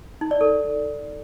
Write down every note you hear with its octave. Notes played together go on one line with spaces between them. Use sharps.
D#4
D5
A4